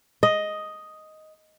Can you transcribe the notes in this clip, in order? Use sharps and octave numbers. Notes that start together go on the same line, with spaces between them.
D#5